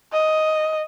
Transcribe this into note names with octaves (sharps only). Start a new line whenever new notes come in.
D#5